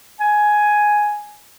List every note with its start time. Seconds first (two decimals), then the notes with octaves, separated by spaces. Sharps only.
0.21 G#5